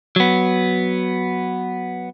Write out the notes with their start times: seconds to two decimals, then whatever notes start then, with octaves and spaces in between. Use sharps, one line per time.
0.16 F#3 B3